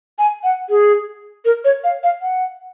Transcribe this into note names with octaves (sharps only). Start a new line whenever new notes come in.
G#5
F#5
G#4
A#4
C#5
F5
F5
F#5